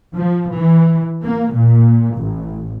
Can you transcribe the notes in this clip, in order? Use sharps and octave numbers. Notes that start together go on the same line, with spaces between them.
F3
E3
A#3
A#2
A1